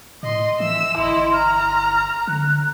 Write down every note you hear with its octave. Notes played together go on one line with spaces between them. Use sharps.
A2 D#5 C6
E3 E5 E6
G1 E4 D#5 C6
A#5 F6
D3 F#6